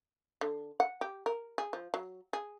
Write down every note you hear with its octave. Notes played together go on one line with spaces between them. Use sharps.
D3
F#5
G4
A#4
G#4
F3
F#3
G#4